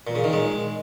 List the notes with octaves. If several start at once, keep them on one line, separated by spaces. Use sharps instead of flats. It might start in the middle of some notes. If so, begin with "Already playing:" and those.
A#2
C#3
D#3
G#3